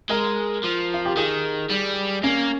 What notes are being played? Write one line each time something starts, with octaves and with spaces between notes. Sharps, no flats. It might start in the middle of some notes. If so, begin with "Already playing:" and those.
G#3 A#4
F3
F4
G4
D#3 G#4
G3
A#3 C#4